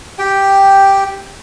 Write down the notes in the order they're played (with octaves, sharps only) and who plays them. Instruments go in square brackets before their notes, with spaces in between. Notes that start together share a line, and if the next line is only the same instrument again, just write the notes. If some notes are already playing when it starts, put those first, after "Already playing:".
[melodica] G4 G5